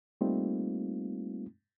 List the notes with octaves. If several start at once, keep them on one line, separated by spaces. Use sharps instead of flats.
G3 A3 A#3 C4 D#4 F4